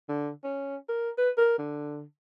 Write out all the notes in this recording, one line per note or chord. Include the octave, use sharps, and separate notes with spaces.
D3
C#4
A#4
B4
A#4
D3